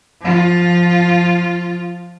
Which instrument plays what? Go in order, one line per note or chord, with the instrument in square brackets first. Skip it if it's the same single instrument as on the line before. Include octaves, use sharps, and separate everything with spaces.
[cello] F3 F4